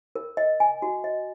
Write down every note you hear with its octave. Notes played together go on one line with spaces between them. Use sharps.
A#4
D#5
G#5
F#4
D#5